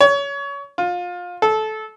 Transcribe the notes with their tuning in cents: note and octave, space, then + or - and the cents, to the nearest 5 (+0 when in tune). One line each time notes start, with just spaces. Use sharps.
C#5 +25
F4 +25
A4 -20